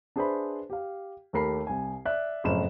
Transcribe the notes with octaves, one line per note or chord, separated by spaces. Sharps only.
D4 G#4 B4 C5 E5 B5
G4 F5
D#2 A3 G4 A#4 B5 C7
C2 G#5
D5 E5 F#6
F#1 F2 A2 E7